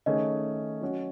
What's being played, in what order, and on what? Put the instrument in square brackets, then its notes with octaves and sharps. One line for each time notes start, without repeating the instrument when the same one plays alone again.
[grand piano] D#3 A3 C#4 G#4 [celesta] D#5
[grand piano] F#3 C#4 F#4